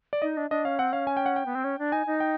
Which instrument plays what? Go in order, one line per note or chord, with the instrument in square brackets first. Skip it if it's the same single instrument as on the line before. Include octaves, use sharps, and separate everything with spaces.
[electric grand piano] D5
[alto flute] D#4 [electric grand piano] D#5
[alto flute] D4
[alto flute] D4 [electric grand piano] D#5
[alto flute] C#4 [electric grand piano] F5
[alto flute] C4 [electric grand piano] F#5
[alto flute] C#4 [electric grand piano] F5
[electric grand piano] G#5
G5
F#5
G5
[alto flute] B3
C4
C#4
D4
[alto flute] D#4 [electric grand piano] G#5
[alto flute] D#4
[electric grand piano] G5